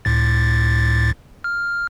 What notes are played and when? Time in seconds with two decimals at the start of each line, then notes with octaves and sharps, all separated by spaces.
0.05 C#2 A2 A6
1.44 F6